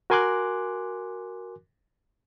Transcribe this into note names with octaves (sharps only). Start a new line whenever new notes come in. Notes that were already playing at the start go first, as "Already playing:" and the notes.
F#4 A#4 G#5 C6 D6 F#6